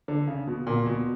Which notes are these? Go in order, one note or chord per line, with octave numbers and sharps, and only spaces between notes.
D3
C#3
B2
A#2
B2